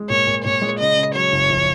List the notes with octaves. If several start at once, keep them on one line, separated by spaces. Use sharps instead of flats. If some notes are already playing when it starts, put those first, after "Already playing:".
Already playing: G#3
A#2 C#5
A#2
A#2 C#5
G#3
C#3 D#5
C#3
F#3 C#5
F#1
A#1